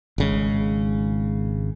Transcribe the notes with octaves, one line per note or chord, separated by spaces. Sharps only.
G#1 C#3 G#3